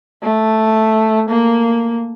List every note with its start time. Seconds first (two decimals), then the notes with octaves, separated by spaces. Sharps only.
0.23 A3
1.29 A#3